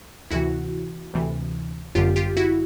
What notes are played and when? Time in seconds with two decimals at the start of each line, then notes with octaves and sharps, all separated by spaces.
0.31 D2 C3 E3 E4 F#4
1.13 D2 C3 E3
1.95 G1 F#2 D3 F4 G4
2.16 F4 G4
2.37 E4 F#4